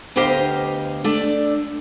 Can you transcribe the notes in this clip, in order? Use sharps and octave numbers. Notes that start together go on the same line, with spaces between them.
D2 B3 G4 C5 D#5 F5
A3 D4 D5